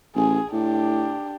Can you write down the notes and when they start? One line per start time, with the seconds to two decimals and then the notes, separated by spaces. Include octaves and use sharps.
0.15 A1 G#4 G#5
0.52 A2 D4 G4